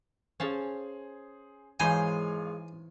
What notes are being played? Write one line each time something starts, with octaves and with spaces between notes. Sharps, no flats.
C#4 G#4 C5 F5 A5
G#1 E3 G#3 D#4 C5 C#5 F5 G#5